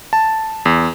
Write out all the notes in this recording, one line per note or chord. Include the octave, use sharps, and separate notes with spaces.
A5
E2